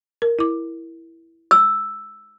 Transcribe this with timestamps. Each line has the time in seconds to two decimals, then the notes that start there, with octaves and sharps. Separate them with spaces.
0.22 A#4
0.39 E4 D6
1.51 E6